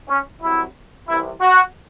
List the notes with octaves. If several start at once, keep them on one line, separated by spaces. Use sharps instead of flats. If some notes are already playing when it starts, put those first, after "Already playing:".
C#4
C2 C3 F#3 E4
C2 C3 E3 E4
F#4